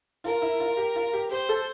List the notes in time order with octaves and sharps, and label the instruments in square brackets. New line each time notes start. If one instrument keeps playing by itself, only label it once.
[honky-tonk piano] F4 [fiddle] A#4
[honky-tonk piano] E4
F4
G4
F4
G4
[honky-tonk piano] G4 [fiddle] C5
[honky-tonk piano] A4